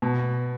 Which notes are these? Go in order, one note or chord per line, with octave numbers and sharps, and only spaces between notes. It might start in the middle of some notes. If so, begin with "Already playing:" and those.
B2